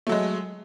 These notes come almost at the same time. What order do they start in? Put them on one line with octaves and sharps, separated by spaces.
A3 F#3 G#3